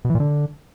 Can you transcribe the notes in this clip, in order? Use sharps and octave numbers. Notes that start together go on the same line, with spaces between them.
B2
E3
A#2
D3